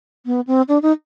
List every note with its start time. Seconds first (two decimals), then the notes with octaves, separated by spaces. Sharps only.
0.26 B3
0.47 C4
0.68 D4
0.82 D#4